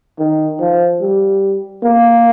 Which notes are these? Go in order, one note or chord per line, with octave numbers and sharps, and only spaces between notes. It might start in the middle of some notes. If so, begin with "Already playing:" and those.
D#3
F3
G3
A#3